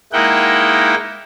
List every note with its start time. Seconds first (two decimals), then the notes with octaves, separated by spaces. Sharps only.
0.13 G#3 A#3 D#4 E4 F#5 G5